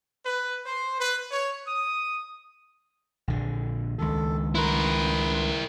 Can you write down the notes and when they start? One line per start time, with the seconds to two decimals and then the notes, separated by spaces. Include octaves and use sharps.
0.24 B4
0.66 C5
0.99 B4
1.31 C#5
1.67 D#6
3.28 A#1 D3
3.98 C#2 D#3 A4
4.55 E4 A#4 B4 B5 C6